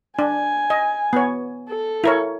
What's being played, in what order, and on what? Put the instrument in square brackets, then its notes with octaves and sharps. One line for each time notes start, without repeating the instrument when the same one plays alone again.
[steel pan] D4 [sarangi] G#5
[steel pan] D#5
B3 C#5
[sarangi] A4
[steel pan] E4 A#4 C#5